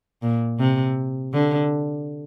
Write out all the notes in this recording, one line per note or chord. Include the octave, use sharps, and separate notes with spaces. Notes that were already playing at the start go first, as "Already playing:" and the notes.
A#2
C3
D3